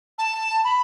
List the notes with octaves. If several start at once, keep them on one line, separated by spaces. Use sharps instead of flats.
A5
B5